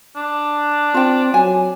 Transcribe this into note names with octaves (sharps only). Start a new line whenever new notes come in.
D4
C4 F4 G5
F#3 G#5